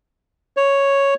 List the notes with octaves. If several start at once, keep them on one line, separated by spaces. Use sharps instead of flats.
C#5